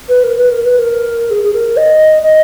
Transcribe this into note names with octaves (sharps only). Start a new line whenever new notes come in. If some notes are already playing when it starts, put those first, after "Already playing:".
B4
A#4
B4
A#4
B4
A#4
G#4
G#4
A#4
D#5
D#5